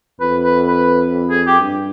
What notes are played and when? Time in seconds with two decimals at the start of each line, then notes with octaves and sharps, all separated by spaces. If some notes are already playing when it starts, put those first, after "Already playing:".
0.21 F2 B4
0.44 B4
0.67 B4
1.30 G#4
1.46 G4
1.61 G2